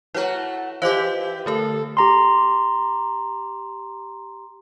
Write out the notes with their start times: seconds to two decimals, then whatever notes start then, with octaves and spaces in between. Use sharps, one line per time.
0.14 A3 E4 F#4 B4 C#5 A#5
0.82 E3 F4 G4 B4 C5 D#5 F5 D6
1.46 D3 A3 A4 A#4
1.97 G4 A#5 C6